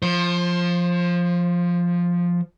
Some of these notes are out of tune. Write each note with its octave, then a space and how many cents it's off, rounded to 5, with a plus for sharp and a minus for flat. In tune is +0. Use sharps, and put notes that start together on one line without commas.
F3 +0 C5 +25